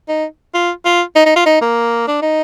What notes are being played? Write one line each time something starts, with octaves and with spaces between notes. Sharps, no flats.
D#4
F4
F4
D#4
D#4
F4
D#4
A#3
D4
D#4